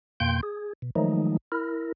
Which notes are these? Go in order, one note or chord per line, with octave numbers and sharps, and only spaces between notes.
F2 B2 A#3 G5 C6 G6
G#4
B2
D#3 F3 F#3 G#3 A3 D#4
E4 A#4